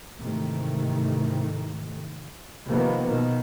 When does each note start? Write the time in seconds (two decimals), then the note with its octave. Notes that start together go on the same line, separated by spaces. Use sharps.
0.21 G#2 C3 D#3 E3 A3
2.68 C3 D#3 F3 A#3 B3
3.07 B2 D#3